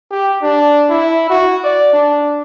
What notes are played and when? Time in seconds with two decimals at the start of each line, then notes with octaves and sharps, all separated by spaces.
0.11 G4
0.42 D4
0.90 E4
1.30 F#4
1.64 D5
1.93 D4